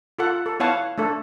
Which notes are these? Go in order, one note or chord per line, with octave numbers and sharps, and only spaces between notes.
F4 A4 F#5
A4
B3 E4 C#5 F5 F#5 A5
A3 D4 A4